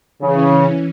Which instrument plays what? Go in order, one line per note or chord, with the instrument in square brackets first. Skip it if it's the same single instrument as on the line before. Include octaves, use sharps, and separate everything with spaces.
[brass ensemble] C#3 [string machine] E3 C#4